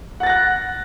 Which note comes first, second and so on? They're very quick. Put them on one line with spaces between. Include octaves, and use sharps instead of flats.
F#5 A6 A#6 F#6